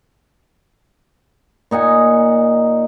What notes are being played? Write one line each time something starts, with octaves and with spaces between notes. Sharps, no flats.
A#2 D#4 F#5 G#5